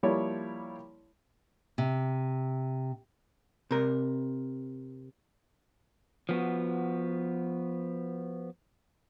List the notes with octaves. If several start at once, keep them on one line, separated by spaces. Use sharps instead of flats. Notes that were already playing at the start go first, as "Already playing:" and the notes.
F3 G3 A#3 E4 C#5 D5
C3
C3 A#4
F3 B3 F#4